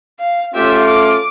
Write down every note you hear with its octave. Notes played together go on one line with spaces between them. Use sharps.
F5
A3 C#4 F4 G4 E5
D6